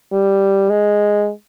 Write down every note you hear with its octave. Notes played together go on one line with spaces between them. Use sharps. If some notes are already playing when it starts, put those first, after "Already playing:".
G3
G#3